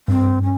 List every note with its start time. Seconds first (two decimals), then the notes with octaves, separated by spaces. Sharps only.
0.08 G2 C4
0.43 C#4